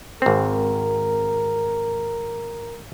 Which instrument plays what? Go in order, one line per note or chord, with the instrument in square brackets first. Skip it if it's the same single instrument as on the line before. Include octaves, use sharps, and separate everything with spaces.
[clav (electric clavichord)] G#1 C4 [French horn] A#4